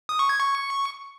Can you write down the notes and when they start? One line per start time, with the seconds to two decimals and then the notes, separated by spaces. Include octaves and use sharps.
0.09 D#6
0.19 C#6
0.29 G#6
0.40 C#6